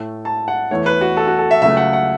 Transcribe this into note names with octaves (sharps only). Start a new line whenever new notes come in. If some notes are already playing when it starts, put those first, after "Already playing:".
Already playing: A2 A3
A5
F#5
E2 E3 A3 C#5
B4
F#4
A4
F#4
A4
E5
C#2 C#3 F#3 A3 E5
F#5
F#5